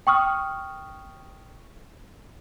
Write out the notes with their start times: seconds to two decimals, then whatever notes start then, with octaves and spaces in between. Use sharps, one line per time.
0.07 G5 C#6 D#6 F6